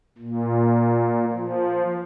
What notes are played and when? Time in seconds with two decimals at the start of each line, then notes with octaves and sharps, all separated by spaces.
0.18 A#2
1.31 F3